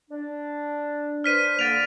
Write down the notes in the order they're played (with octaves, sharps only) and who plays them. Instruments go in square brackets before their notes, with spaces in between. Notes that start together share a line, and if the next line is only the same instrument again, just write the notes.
[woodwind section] D4
[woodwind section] D4 B4 C5 [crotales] F6 B6 D#7
[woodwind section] D3 A#3 [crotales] A6 D7 F7